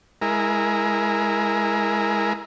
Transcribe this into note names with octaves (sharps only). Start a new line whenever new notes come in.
G#3 E4 A#4